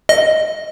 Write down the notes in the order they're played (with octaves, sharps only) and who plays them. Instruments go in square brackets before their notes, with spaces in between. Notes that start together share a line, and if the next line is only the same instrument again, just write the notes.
[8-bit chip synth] D#5